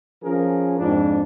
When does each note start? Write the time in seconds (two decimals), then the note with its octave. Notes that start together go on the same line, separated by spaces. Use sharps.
0.24 F3 C#4 G#4 A#4
0.79 F2 G#2 D4